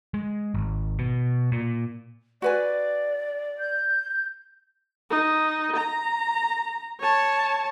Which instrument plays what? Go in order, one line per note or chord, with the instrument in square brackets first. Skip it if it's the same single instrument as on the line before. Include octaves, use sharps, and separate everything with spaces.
[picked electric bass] G#3
G#1
B2
A#2
[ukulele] F#4 B4 G#5 [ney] D5
[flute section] G6
[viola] D#4
A#5
C#5 A5